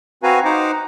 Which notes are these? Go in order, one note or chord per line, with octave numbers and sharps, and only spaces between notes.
C4 F#4 B4 F5 G#5 A#5
D#4 C5 F#5 A#5 D6